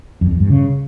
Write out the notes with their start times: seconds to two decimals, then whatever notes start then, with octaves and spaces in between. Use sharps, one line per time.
0.21 F2
0.31 E2
0.40 G2
0.50 C#3